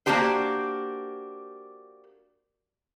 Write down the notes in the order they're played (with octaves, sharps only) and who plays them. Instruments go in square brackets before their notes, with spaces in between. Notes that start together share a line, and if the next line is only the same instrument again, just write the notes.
[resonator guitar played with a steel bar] A#3 C4 D4 F#4 G4 C5